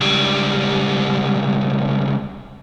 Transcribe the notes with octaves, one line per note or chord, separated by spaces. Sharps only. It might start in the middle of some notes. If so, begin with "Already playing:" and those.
C#2 G3